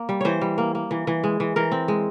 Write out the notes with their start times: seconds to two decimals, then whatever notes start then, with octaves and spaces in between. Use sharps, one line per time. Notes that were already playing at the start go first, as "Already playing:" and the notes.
Already playing: A#3
0.09 G3
0.21 E3 C5 C#5
0.41 G3
0.58 A#3
0.75 A#3
0.91 E3
1.07 E3
1.24 G#3
1.40 E3
1.56 E3 A#4
1.72 C4
1.88 G#3